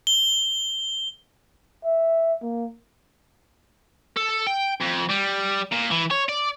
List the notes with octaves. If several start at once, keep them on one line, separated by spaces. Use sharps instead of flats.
G7
E5
A#3
A4
G5
F2
G3
A#2
E3
C#5
D5